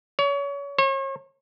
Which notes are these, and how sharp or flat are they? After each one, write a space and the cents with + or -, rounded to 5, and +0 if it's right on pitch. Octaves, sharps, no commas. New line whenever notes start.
C#5 +30
C#5 -40